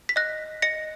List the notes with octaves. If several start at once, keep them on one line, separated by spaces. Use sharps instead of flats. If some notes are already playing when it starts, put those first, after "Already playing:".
B6
D#5 F#6 A#6
D#5 A#6 C#7